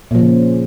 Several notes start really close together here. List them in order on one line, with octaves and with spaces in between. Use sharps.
A#2 F3 C#3